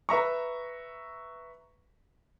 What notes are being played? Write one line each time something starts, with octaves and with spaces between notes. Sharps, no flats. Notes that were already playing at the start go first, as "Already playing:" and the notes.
B4 E5 A#5 C#6